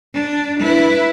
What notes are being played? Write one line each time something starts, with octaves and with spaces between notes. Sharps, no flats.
D4
E4 B4